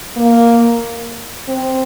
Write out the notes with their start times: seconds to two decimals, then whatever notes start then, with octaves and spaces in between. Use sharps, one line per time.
0.16 A#3
1.48 C4